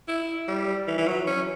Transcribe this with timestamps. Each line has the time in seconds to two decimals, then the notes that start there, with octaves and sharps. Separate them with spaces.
0.08 E4
0.48 G3
0.87 E3
0.98 E3
1.07 F#3
1.27 C#4